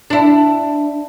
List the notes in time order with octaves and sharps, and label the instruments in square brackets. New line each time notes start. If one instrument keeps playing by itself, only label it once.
[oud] D4 E4